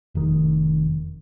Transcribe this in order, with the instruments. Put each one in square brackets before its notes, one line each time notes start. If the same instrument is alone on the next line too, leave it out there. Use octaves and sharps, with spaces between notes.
[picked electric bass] F1 D#3